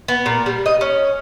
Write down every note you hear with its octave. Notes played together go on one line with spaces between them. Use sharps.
B3
A#2
G3
D#5
C#4